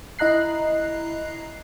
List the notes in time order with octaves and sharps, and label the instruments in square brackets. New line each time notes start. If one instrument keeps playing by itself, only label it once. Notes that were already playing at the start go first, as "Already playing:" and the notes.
[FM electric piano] E4 D#5 A#5 F#6 C7